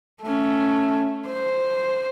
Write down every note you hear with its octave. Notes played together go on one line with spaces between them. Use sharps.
A3 C#4
C5